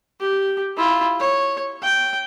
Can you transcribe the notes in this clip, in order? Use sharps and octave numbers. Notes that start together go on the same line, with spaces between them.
G4
E4 F4
C#5
G5